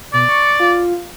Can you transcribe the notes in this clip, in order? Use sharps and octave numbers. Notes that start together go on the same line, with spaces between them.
B2 D5
C#6
F4